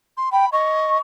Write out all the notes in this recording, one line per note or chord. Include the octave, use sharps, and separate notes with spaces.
C6
G5 B5
D#5 C#6